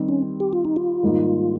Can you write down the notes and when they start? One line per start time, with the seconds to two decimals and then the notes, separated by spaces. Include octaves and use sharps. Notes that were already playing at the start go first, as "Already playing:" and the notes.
Already playing: D#3 G3 C4
0.09 C#4
0.40 G4
0.53 F4
0.65 D#4
0.76 F4
1.03 G#2 D#3 G3 A#3